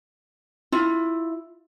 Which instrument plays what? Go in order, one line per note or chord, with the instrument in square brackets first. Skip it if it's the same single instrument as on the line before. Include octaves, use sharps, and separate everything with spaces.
[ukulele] E4 F4